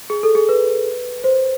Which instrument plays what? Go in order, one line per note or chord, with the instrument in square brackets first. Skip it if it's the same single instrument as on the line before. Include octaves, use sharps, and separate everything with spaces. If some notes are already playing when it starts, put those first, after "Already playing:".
[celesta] G#4
A4
G#4
B4
C5